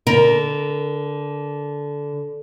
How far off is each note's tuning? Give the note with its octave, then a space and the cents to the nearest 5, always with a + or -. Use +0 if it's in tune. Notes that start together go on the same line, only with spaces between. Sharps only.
D3 -15 A#4 +10